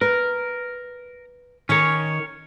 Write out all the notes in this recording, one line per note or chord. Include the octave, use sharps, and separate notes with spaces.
A#4 B4
D#3 C#4 A#4 C#5